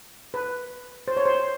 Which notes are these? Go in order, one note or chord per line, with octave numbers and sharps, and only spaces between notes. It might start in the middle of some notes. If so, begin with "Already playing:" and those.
B4
C5
C#5
C5